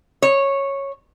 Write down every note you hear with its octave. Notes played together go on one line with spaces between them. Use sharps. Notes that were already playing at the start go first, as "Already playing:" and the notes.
C#5